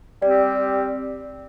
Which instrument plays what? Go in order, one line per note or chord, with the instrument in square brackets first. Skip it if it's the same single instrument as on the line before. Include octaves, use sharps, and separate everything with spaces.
[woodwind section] G3 C4 G4 [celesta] D5